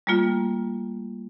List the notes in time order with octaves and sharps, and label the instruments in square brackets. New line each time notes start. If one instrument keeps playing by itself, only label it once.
[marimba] G3 A3 A#3 F4